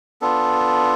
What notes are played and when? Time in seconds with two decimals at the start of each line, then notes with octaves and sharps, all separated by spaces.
0.21 B3 D4 F4 A4